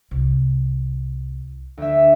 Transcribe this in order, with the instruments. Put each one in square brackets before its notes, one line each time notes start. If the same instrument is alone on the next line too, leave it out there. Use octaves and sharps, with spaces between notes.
[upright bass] C2
[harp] D2 E5